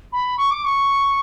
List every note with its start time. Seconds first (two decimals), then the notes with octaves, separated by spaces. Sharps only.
0.12 B5
0.38 C#6
0.51 D6
0.64 C#6